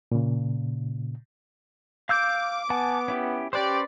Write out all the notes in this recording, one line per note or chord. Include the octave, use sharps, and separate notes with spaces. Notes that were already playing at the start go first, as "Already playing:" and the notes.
A#2 C#3
F5 D6 E6 G6
B3 F#5 G#5 A5
C#4 E4 G4
C#4 G4 B4 C5 D5